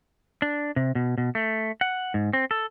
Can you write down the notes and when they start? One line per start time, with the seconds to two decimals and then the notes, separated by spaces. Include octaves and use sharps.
0.42 D4
0.76 C3
0.95 B2
1.18 B2
1.35 A3
1.81 F#5
2.14 G#2
2.33 C4
2.51 A4